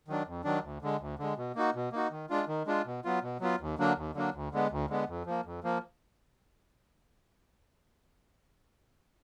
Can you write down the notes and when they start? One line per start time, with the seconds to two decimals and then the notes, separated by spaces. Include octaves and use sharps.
0.08 D#3 F#3 D4
0.27 F2
0.44 D#3 F#3 D4
0.63 D2
0.82 D3 G#3
1.00 D2
1.19 D3 G#3
1.37 B2
1.56 A#3 D#4 F#4
1.75 B2
1.92 A#3 D#4 F#4
2.11 D#3
2.30 G#3 D4 F4
2.48 D#3
2.67 G#3 D4 F4
2.85 B2
3.05 F#3 B3 F4
3.23 B2
3.41 F#3 B3 F4
3.60 D#2
3.79 D3 F#3 A#3 D4
3.97 D#2
4.15 D3 F#3 A#3 D4
4.34 D2
4.52 D3 G#3 B3
4.71 D2
4.90 D3 G#3 B3
5.08 F2
5.26 F3 A#3
5.45 F2
5.64 F3 A#3